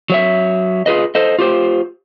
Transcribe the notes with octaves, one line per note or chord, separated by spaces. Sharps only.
F#3 C#5 E5
F4 G#4 B4 D#5
A4 C5 D#5
F4 G4 C5